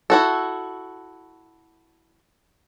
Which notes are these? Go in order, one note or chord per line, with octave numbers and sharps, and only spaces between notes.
E4 F#4 A4